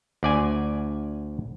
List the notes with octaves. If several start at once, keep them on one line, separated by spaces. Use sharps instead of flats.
D2 D5 G#5